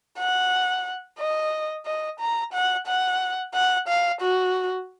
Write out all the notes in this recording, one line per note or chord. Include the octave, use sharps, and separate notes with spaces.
F#5
D#5
D#5
A#5
F#5
F#5
F#5
F5
F#4